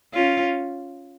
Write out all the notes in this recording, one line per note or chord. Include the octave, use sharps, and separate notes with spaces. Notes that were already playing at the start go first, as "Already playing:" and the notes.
C#4 F4